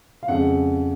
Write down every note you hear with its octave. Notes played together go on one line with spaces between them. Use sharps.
F5
F2 C#3 G#3 F#5